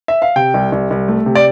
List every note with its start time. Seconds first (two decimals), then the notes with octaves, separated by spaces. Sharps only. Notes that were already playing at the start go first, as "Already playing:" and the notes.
0.08 E5
0.22 F5
0.36 C3 G5
0.54 C2
0.72 C2
0.90 C2
1.08 A3
1.26 C3
1.35 D5